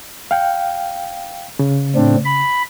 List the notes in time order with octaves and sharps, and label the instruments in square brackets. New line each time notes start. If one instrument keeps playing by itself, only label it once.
[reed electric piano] F5 G5
C#3
[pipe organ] A2 C4 D4
B5